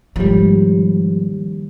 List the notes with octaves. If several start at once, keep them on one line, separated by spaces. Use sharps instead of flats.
D#2 G#2 F3 G3